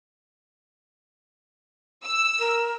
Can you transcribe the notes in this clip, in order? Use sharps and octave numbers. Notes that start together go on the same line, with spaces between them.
E6
A#4